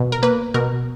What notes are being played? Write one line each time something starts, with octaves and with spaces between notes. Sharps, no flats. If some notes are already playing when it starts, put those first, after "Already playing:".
Already playing: B2
A#4
A#3 B4
B2 A#4